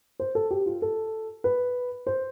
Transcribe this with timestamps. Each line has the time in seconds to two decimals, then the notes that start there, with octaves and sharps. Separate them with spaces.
0.20 C5
0.35 A4
0.51 G4
0.66 F4
0.82 A4
1.44 B4
2.07 C5